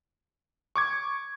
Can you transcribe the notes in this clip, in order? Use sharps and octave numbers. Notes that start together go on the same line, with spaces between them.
C#6 D6 G#6